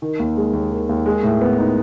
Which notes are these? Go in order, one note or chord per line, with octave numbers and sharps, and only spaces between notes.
D#3
D#2
G#3
D#2
D#3
D#2
G#3
A2
B3
D#4